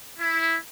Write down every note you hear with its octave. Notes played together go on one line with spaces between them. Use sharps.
E4